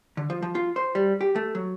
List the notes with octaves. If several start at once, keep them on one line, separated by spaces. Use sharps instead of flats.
D3
F3
F3
F4
C5
G3
G4
A3
F#3